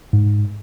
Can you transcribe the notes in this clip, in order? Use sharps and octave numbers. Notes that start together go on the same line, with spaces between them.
G#2